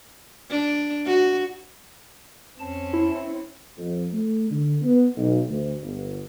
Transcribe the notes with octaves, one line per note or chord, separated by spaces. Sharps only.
D4
F#4
F2 C4 C#4 A5
E4
F2
A3
D3
B3
B1
D2
G1